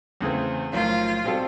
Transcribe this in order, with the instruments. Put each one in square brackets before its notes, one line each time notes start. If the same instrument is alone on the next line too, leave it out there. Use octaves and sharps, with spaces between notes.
[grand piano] E2 C#3 E3 A3 C4
[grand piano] B1 A2 F3 A#3 [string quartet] F4
[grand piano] B2 G3 C4 F4 A4